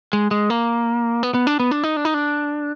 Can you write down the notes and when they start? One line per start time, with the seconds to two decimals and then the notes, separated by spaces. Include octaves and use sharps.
0.13 G#3
0.31 G#3
0.50 A#3
1.23 B3
1.34 B3
1.47 D4
1.60 B3
1.71 D4
1.83 D#4
1.97 D4
2.05 D#4
2.14 D4